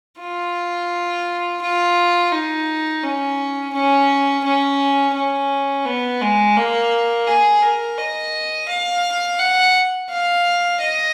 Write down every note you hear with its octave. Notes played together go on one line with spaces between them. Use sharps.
F4
F4
D#4
C#4
C#4
C#4
C#4
B3
G#3
A#3
G#4
A#4
D#5
F5
F#5
F5
D#5